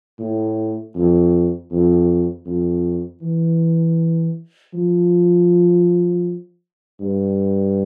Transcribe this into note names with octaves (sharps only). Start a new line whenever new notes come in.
A2
F2
F2
F2
E3
F3
G2